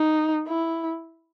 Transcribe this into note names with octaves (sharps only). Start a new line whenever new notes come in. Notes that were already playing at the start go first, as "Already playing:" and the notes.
Already playing: D#4
E4